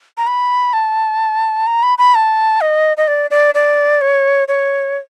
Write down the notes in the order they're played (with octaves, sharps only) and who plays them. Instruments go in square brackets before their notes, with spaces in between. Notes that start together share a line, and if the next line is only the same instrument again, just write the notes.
[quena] A#5
B5
A5
A#5
B5
B5
A5
D#5
D#5
D5
D5
D5
C#5
C#5